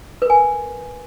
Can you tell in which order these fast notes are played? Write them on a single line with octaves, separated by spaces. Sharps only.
B4 A#4 G#5